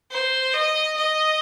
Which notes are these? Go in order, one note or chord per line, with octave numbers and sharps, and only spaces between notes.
C5
D#5
D#5